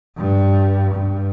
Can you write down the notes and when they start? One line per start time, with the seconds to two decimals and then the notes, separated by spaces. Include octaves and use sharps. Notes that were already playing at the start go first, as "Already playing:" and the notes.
0.17 G2
0.95 G2